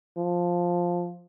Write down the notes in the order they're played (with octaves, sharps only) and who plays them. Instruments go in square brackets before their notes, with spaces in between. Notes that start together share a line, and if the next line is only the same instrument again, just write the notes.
[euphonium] F3